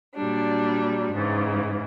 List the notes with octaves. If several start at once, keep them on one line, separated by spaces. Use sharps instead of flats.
A#2 F#3 G3 D4
G#2 C#3 E3